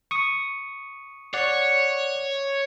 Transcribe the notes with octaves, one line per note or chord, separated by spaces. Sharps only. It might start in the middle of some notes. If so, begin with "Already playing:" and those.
C#6 D#6
C#5 D5 F#5